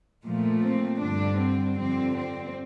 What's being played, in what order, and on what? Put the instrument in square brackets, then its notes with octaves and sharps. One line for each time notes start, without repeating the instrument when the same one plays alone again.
[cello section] A#2 F3 A3
C4
G2 D3 G3 D4
C4
F2 D3 G3 C4
C4